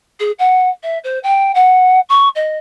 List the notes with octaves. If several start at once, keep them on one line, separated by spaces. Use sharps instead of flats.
G#4
F#5
E5
C5
G5
F#5
C#6
D#5